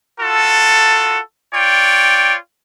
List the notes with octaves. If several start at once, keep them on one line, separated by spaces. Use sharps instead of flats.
F4 F#4 A4
F4 C#5 D5 G5